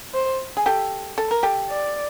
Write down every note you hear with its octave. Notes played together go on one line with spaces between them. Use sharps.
C5
G#4
G4 A4
A4
A#4
G4 A4
D5